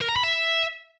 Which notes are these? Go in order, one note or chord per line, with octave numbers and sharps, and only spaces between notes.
A#4
A#5
B5
E5